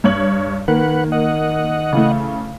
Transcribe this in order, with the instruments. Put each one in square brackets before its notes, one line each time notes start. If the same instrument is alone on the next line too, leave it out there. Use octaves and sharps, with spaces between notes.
[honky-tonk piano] G2 C#5 F#7
[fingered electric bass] D#3 [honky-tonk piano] A#3 [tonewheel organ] B4 F#5
[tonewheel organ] D#5 F#5
[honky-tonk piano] C#3 E3 A3